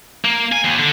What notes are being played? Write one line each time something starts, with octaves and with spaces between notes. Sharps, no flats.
A#3
G#5
D#2
D3